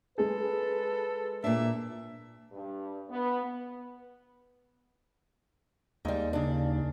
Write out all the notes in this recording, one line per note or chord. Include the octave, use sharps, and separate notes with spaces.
G#3 G#4 A4 B4
A#2 D4 E5
G2
B3
D#2 G3 G#3
C#3 D4